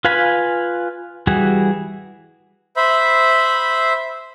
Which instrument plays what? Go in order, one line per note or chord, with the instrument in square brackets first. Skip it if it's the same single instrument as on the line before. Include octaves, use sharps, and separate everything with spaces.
[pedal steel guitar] F4 B4 F5 G#5 B5
E3 G3 F#4 G#4
[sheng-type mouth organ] C5 E5 B5